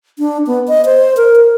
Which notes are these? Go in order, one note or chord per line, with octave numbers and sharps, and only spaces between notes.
D4
B3
D#5
C5
A#4
A#4